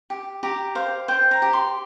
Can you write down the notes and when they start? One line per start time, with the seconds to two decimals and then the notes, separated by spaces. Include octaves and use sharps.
0.10 G4
0.43 G4 A#5
0.75 C5 F5
1.08 C5 G5
1.31 A#5
1.42 G4
1.53 C6